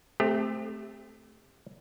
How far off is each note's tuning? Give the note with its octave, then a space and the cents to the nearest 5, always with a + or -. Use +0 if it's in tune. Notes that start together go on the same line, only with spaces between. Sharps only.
A3 -10 C4 -10 G4 +25